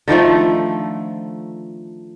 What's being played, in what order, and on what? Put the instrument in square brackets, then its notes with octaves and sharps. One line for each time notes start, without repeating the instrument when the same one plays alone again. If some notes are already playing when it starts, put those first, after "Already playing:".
[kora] D3 D#3 F3 A3